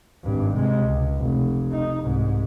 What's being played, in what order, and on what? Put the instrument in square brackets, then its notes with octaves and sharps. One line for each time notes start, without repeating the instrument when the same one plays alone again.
[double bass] G#1 G2
C3 G#3
C#2
F1
D#4
C2 G#2